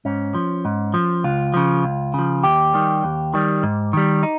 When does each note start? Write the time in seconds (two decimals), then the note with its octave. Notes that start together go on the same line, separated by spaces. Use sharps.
0.05 G#2 C#4
0.34 F3
0.65 G#2
0.94 F3
1.24 C#2 F4
1.54 C#3 F3
1.84 C#2
2.14 C#3 F3
2.43 D#2 G4
2.74 D#3 G3
3.04 D#2
3.34 D#3 G3
3.63 G#2
3.93 D#3 G3
4.23 D#4